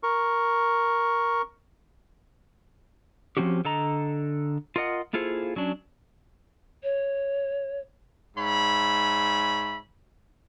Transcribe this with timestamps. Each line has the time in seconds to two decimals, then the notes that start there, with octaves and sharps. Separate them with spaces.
0.03 A#4 C#6
3.37 F3 C4 C#4 F#4 G4
3.65 D3 A4 D#5 A#5
4.76 F4 A#4 D#5 F#5
5.13 A#3 E4 F4 G#4 A4 C5
5.56 F#3 C#4 D4
6.83 C#5
8.37 G#2 C#5 E5 B5